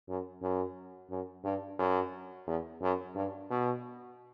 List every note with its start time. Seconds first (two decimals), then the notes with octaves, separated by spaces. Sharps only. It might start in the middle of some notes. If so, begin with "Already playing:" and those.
0.08 F#2
0.42 F#2
1.10 F#2
1.44 G2
1.79 F#2
2.47 E2
2.82 F#2
3.15 G2
3.50 B2